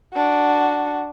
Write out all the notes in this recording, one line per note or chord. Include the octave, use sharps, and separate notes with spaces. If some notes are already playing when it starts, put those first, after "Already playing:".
D4 F#4